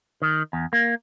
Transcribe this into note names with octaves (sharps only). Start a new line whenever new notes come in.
D#3
E2
A#3